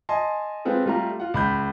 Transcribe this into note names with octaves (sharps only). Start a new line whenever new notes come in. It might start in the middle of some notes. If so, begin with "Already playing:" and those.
D#5 G#5 A5 C6
G#3 C4 F4 A4 B4
G3 A3 F4 G4 A#5
F4 F#5
C#2 B5 G6